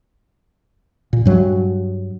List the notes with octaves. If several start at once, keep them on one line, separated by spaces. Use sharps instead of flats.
A#2
G2 F#3